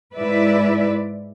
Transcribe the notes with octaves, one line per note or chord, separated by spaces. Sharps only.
G#2 G#3 E4 B4 D5 E5